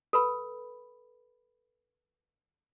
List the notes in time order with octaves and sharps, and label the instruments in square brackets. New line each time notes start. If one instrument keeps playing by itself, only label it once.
[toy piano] A4 B4 B5